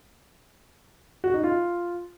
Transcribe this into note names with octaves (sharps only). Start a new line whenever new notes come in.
F#4
D#4
F4